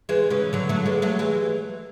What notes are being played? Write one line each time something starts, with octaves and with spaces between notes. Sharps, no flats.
E3 G#3
C#3 E3
D3 F#3
F#3 A3
G#3 B3
F#3 A3
E3 G#3